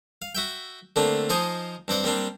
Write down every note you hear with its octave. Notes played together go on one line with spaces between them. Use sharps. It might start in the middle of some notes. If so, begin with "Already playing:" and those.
F5
F#4 E5 G5
D3 A3 A#3 C4 D4
F3 D#4 C5 D#5 G#5 D#6
G2 C4 D5 F#5
G3 A#3 C4 D4